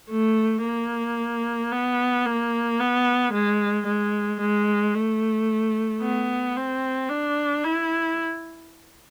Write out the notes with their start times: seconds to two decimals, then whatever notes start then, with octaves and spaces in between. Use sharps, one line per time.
0.11 A3
0.64 A#3
1.72 B3
2.26 A#3
2.80 B3
3.33 G#3
3.87 G#3
4.41 G#3
4.95 A3
6.02 B3
6.57 C4
7.09 D4
7.64 E4